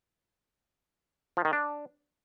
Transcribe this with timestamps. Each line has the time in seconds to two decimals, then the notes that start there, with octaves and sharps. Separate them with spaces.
1.37 F3
1.45 D#3
1.53 D4